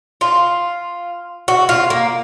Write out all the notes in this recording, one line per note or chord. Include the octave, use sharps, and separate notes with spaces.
F4
F#4
F4
A#3